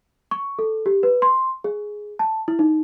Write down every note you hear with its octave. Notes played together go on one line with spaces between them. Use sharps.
C#6
A4
G4
B4
C6
G#4
A5
E4
D#4